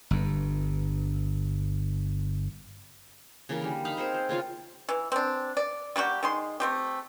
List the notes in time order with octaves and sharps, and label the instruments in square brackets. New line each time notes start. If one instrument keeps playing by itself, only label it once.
[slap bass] G1 G2
[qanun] C#3 E3 A#3 A#4
D3 G3
D#4 F5 B5
C4 G#4 A#4 C5
C5
C#3 C#4 F4 F5
[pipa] E3
C4 D4
D5
G3 A#3 F#4 G4
D#3 G#3 C6
A3 C4 G4